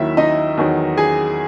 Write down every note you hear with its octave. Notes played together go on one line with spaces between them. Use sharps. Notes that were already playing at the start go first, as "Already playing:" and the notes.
Already playing: D#2 D#3 F#3 E4 E5
D#4 D#5
E2 D#3 F#3
G#4 G#5